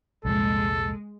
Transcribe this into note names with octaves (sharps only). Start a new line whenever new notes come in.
C2 F2 A#2 G#3 A4